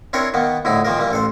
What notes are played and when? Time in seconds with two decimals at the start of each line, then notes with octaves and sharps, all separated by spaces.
0.13 C4 D4 E4 A#4 C5 C#5
0.34 D#3 A#3 B3
0.65 A#1 A2 D3 D#4 E4
0.85 A#2 D#3 F3 A#3 A#4
0.99 E3 G3 A#3
1.11 A1 A4 C5